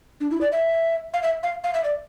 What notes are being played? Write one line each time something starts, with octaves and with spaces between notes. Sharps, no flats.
D4
E4
D5
E5
F5
E5
F5
F5
E5
D5